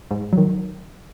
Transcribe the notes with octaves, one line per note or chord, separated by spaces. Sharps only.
G#2
D#3 F#3